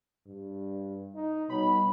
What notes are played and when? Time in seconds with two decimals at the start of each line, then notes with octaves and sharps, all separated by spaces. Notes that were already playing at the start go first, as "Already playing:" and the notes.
0.27 G2
1.15 D#4
1.49 B2 G3 D#4 C#5 B5